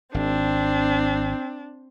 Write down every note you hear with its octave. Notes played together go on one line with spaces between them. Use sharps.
G#1 C4 D4